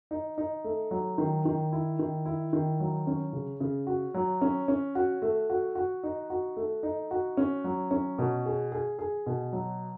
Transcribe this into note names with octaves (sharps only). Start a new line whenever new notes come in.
D#4
D#4
A3
F#3
D#3
D#3
E4
D#3
E4
D#3
F#3
C#4
C#3
C#3
F#4
F#3
C#4
C#4
F#4
A3
F#4
F#4
D#4
F#4
A3
D#4
F#4
C#4
F#3
C#4
B2
G#4
G#4
G#4
B2
F#3